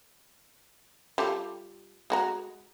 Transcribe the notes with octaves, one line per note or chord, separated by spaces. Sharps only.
G3 F4 A4
G#3 F#4 A#5